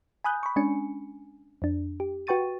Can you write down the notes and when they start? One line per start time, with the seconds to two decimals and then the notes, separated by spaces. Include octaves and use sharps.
0.24 G#5 B5 D#6 F#6 G6
0.43 B5 C#6
0.56 G#3 C#4 D4 G#5 C#7
1.62 F2 D4
2.00 G4
2.27 F#4 B4 G5 C#6 A6 D#7